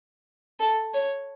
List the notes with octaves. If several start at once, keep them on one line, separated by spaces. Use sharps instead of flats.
A4
C#5